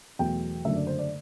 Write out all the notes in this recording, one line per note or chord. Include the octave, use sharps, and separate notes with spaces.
E2 B2 F#3 A3 G5
F#1 F#2 D3 A3 E5
D5
C5
D5